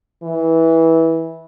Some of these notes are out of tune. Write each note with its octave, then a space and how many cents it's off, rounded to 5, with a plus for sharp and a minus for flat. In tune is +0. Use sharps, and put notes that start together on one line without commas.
E3 -15